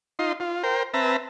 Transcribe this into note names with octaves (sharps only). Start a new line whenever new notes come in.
D#4 F4 C6
F4
A#4 C5 G5
C4 B4 E5 A5 A#5